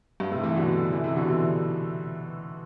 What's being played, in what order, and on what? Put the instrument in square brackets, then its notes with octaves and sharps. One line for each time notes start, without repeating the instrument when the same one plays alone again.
[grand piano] G2
A2 C3
C3 E3
B2 D3
C3 E3
C3 E3
B2 D3
C3 E3